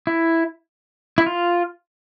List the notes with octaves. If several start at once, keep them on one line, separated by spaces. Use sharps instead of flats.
E4
E4
F4